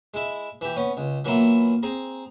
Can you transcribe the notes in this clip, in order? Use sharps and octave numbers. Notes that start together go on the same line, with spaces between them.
G#3 E4
E3 G4
B3 C#4
C#2
E3 F#3 A#3 B3 E4 F4
C4 G#4 A#5